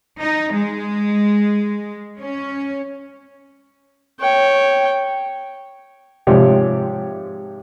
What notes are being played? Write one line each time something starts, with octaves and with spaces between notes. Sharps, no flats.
D#4
G#3
C#4
C#5 G5
G#2 C3 F3 G4 C#5 D5